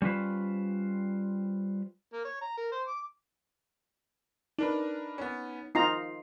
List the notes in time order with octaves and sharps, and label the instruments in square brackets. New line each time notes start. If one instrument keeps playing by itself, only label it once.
[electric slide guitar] G3 C#4 F4 B4 C5
[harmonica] A#3
C#5
A#5
A#4
C5
D6
[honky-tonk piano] D4 A#4 B4 [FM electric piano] D#4
[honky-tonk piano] B3 C#4
[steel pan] D#4 F4 A#5 [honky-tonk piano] C7